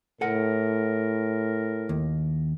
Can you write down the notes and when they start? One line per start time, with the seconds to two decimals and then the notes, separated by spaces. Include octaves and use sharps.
0.21 A2 A4 A#4 F#5
1.89 D#2